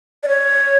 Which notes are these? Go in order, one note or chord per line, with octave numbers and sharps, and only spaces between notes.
D5
C#5